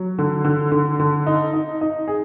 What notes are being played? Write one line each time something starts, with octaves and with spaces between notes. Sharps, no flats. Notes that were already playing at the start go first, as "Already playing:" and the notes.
Already playing: F#3
D3
D3
D3
D3
D#4
D#4
D#4
G#4